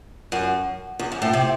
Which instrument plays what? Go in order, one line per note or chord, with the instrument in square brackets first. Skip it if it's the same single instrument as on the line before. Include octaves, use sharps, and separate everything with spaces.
[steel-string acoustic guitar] F#2
E2
F#2
A2
C3